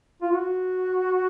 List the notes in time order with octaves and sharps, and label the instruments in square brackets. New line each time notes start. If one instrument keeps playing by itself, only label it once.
[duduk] F4
F#4